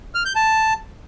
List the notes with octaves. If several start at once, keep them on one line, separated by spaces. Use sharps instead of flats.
F6
G6
A5